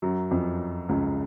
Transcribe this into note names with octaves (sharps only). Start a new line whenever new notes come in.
F#2 F#3
F2 F3
C#2 C#3